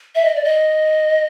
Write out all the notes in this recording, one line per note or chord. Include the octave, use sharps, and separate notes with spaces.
E5
D#5
D5
D#5